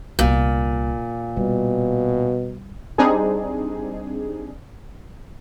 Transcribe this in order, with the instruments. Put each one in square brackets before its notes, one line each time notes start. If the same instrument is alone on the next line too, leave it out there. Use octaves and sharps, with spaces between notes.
[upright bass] C2 A#3 [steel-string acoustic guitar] A#2
[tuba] B2 [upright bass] G3
[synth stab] G3 C4 D4 D#4 G#4